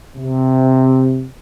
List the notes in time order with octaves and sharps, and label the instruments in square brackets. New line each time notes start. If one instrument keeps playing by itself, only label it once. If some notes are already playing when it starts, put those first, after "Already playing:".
[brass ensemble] C3